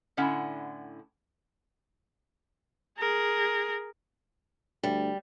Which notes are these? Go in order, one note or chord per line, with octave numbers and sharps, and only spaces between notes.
A2 D3 C#4 E4 F#5
G#4 A#4
D2 G3